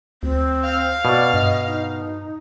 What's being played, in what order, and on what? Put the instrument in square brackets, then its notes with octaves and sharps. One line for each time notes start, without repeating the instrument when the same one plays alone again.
[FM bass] D2 [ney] C4
[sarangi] F5
[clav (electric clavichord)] B2 [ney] D5
[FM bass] G2 [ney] D#5
[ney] D#4